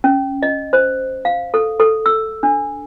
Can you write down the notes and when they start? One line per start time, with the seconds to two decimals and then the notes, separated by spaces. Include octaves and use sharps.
0.04 C#4
0.43 D#5
0.73 C5
1.25 F5
1.54 A4
1.80 A4
2.06 E6
2.43 D4